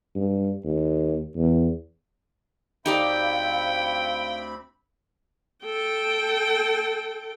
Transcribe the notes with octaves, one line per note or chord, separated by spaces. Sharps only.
G2
D#2
E2
D2 C4 D#4 G4 D5 F5 G5 B5
A4 G5